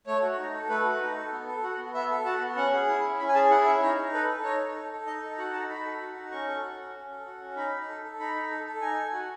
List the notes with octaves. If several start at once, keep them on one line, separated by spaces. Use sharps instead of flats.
A3 C#5
F#4
D#4
A4
A3 B4
F#4
D#4
A4
B3
A4
F#4
B3
B3 E5
A4
F#4 A5
B3
C#4 F#5
G#4
E4
C#4
C#4 B5
G#5
G#4 A5
E4 F#5
C#4 E5
D#4 C#5
D#4
A4 B4
A4
D#4 C#5
D#4
A4
A4
D#4 D#5
A4
F#4 F#5
D#4 A5
D#4 B5
A4
F#4
D#4
C#4 C#6
A4
F#4
C#4
C#4
A4
F#4
C#4
D#4 B5
D#4
A4
A4
D#4 B5
D#4
A4
A4
D#4 G#5
A4
F#4